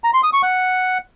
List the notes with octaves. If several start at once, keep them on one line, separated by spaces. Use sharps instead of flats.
A#5
C6
D#6
C#6
F#5